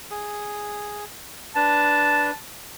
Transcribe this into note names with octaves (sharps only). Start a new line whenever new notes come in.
G#4
D4 B4 A5